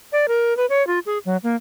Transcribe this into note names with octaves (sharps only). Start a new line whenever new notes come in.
D5
A#4
B4
C#5
F4
G#4
F#3
A#3